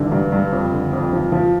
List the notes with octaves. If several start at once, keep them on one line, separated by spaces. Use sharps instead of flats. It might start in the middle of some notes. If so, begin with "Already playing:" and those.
Already playing: G2 D3 E3
G2
G2
F2
D3
F2
F3
F3